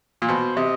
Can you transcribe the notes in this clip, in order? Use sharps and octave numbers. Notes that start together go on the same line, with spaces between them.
A#2
B2 C5
C3 D#5